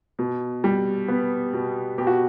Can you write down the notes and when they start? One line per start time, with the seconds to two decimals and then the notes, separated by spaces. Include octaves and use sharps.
0.19 B2
0.64 G3
1.08 B3
1.53 B2
1.98 B2 G4
2.07 F#4